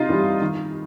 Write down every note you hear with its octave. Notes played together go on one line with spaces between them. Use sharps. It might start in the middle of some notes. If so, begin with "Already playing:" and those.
Already playing: C3 D#4 F4
E3 G3
D#3